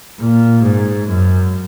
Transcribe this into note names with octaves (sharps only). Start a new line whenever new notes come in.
A#2
G#2
F#2